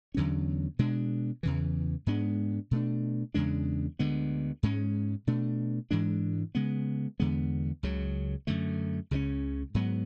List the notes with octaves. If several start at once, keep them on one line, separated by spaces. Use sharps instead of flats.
E2 D3 F#3 C#4
B2 G#3 D4
E2 C#3 E3
G#2 G#3 B3 D4
B2 A3 D4
E2 C#3 G#3 D4
D2 D3 G#3 B3
G#2 G#3 C#4
B2 A3 D4
G#2 E3 G#3 D4
C#3 G#3 B3
E2 D3 G#3 B3
C#2 C#3 F#3
F#2 D3 A3
C#2 C#3 F#3 C#4
G#2 F#3 B3